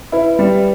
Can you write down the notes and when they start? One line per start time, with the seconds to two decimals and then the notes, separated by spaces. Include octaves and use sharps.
0.12 E4 B4
0.39 G3